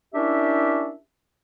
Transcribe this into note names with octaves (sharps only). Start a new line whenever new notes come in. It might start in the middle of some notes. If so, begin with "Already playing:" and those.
C#4 D4 E4 G4 A#4 E5